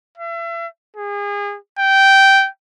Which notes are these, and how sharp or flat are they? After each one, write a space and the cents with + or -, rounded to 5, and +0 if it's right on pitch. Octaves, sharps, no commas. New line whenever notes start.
E5 +35
G#4 -35
G5 -10